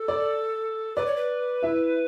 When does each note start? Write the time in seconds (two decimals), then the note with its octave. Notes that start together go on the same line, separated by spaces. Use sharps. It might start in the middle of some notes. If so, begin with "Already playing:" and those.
Already playing: A4
0.08 D5
0.96 B4 D5
1.06 C#5
1.16 B4
1.63 E4 E5